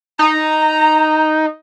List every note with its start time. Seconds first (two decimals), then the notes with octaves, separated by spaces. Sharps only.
0.19 D#4 A#5